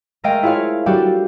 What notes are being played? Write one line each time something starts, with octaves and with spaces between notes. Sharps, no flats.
G#3 A3 A#4 D#5 F5 G5
E4 F4 G#4 C#5 F5
G3 D4 F#4 G4 A4 F5